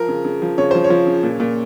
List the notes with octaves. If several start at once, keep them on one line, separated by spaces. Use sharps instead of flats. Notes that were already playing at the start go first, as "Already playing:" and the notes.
Already playing: F3 A#4
C#3
C#3
F3
C#3 C#5
F3 C5
C#5
F3
C#3
A#2
A#2